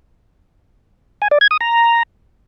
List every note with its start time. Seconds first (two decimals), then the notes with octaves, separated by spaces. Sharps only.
1.22 G#5
1.31 D5
1.41 G#6
1.51 D#6
1.61 A#5